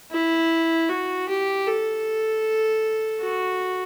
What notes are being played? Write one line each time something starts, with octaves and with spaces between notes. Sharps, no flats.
E4
F#4
G4
A4
F#4